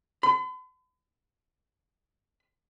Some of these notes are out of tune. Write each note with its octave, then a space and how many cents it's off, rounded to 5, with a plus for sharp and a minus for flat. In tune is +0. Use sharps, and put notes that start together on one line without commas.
B5 +45